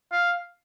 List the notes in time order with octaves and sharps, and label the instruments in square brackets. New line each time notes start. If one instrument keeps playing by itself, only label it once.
[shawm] F5